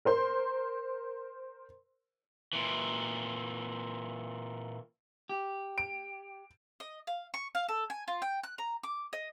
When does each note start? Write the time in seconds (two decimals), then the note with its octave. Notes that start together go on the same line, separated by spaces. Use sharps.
0.05 A#4 C5 C6
2.53 A#2 E3
5.29 G4
5.78 D7
6.80 D#5
7.07 F5
7.34 C#6
7.55 F5
7.68 A4
7.90 G#5
8.08 F4
8.22 G5
8.43 F#6
8.58 A#5
8.83 D6
9.13 D#5